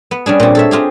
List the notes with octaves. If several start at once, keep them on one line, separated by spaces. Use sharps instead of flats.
B3
G3 C#4 D4 G#4
A#2 C4
A4 C#5 E5
C4 F4 G4 G#4